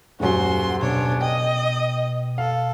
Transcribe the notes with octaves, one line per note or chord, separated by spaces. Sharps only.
D#1 F#2 F#4 C6
B2 D4 C#5
D#5 G5
A4 F5